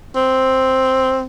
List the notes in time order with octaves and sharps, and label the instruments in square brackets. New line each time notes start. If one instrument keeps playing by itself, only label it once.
[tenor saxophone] C4